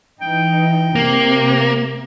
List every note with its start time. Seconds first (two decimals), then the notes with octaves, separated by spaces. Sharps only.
0.21 E3 D#4 G5
0.95 C3 A#3